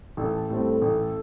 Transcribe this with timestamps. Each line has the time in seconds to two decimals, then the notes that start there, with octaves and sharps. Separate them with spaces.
0.17 A1 A4
0.50 A2 G3 C4
0.82 A1